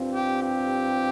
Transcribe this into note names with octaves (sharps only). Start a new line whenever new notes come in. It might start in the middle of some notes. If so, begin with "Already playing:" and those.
Already playing: G2 F3 C4
G4
G4